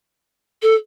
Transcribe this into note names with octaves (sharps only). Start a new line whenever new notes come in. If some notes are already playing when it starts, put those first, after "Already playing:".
A4